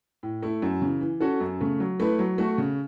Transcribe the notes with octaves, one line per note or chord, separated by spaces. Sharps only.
A2
A3 E4
F#2
C#3 E3
E3
C#4 F#4 A4
F#2
C#3 A3
F#3
A3 E4 B4
F#3
A3 F#4 A4
C#3